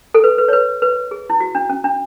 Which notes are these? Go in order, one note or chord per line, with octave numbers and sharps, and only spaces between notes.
A4
B4
B4
C#5
B4
B4
G#4
E4
F#4
D4
C#4
D4